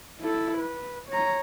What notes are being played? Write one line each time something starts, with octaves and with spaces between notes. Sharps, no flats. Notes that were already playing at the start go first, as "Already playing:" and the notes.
E4 A4
B4
C#5 A#5